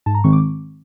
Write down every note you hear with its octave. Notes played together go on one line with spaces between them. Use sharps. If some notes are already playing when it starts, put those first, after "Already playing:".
G#2 A5
A#5
D#3 G#3 C4 C#6
D6